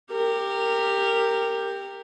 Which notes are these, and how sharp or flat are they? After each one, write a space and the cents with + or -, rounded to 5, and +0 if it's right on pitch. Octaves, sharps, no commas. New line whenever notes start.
G4 +10 A#4 -15